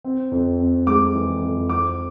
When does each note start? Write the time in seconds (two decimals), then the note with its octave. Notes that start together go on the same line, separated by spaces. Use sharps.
0.04 C4
0.31 F2
0.60 C4
0.87 G#3 D6
1.14 E3
1.42 F2
1.69 C4 D6